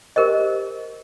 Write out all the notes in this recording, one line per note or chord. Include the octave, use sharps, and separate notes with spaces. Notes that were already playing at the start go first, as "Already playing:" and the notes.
G4 A#4 C5 D#5